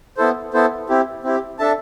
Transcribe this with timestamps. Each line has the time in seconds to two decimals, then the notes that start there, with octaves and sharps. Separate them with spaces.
0.17 B3 E4 A4 C5
0.54 B3 E4 A4 C5
0.89 C4 E4 G4
1.24 C4 E4 G4
1.59 D4 A4 E5 A5